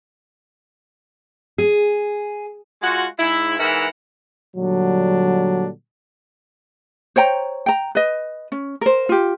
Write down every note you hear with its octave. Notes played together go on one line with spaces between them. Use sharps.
G#4
G#3 F4 F#4
G#2 E4
G#2 E3 A#4 E5 F#5
A#2 D3 F#3 G3 D4
C5 C#5 G5 A#5
G5 A#5
B4 D#5
C#4
A#4 C5
F4 G4